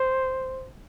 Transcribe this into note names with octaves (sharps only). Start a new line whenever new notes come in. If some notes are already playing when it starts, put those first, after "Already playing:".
Already playing: C5